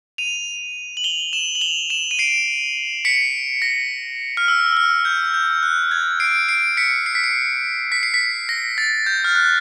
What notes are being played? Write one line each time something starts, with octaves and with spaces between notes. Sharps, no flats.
D#7 F7
F#7
F7 G7
E7 F#7
F#7
F7 G7
E7 F#7
D#7
C7 D7
B6 C#7
A#6
F6
E6
E6
F6
G6
G6
F#6
G#6
C7 D7
C7 D7
B6 C#7
C7
B6
C7
B6
C7
B6
A#6
A6
G6
F6
F#6